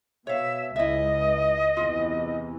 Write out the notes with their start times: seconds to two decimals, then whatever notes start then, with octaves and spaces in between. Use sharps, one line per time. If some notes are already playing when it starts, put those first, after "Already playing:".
0.27 B2 C#5 E5 F5
0.76 C#2 E4 D#5 E5
1.77 E2 C3 E3 F4